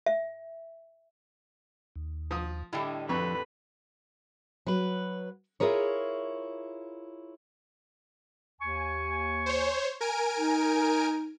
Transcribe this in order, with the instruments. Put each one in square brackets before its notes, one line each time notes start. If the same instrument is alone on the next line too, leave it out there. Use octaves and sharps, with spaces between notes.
[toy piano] E5
[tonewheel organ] D#2
[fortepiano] F3 D#6
[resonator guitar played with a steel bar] A2 D3 G3 [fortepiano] E4 [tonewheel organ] D#5
[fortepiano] F2 B5 C#6 [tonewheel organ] F3 [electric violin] B4
[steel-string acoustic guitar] F#3 B4
E4 F4 G#4 A#4 C#5
[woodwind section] D#2 G#5 C#6
[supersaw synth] C5 C#5
A#4 G#5 D7
[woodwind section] D#4